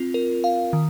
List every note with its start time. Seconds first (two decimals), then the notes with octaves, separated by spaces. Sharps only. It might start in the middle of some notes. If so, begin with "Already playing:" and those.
Already playing: C4 F4
0.14 A#4
0.44 F5
0.73 D#3